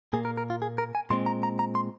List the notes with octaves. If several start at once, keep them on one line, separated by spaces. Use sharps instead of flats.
A#2 A#3 G#4
A#4
A#4
F4
G#4
A#4
G#5
A#2 G#3 C4 C6
A#5
A#5
A#5
C6